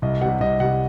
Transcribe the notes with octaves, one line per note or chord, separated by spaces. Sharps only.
C2 D#5
C3 G3 F#5
C2 D#5
C3 G3 F#5